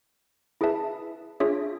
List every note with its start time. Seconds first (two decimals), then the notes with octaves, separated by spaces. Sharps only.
0.61 E4 G#4 B4 E5 A5
1.40 D4 F4 G#4 C#5 E5